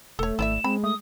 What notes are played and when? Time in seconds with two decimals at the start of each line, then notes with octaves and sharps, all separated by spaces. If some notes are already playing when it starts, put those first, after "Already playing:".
0.19 E1 A3 A4 C#5
0.39 G#1 E4 D5 E5 E7
0.64 G#3 C4 B5
0.84 A3 D#6